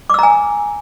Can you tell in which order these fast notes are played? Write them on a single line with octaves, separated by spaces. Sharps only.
D6 E6 A#5 G#5